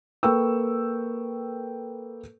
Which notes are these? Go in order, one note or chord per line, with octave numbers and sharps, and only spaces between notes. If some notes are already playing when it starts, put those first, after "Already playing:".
A#3 A4 B4 G5 C#6 E6